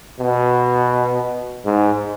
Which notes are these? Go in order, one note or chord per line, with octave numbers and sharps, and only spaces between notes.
B2
G#2